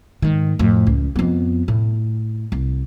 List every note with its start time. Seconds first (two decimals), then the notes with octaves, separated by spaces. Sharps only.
0.22 G#2 D#3
0.59 F2 A2
0.87 C#2
1.16 F2 B3
1.68 A2
2.52 C2